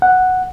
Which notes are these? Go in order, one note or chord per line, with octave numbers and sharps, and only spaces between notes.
F#5